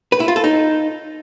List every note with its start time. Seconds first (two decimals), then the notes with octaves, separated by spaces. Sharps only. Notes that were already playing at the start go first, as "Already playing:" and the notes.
0.12 B4
0.20 E4
0.28 F4
0.36 A4
0.44 D#4